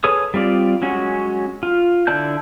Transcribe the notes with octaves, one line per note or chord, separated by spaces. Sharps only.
G#4 A4 B4 C#5 D#6
G3 C4 F4 D5
F#3 G#3 C#4 F#4
F4
D3 E4 D5 A5 G6